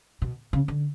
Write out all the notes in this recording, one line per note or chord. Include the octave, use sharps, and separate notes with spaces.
B2
C#3
D3